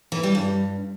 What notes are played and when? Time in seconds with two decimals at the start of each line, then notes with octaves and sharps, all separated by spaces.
0.12 E3
0.23 G3
0.35 G2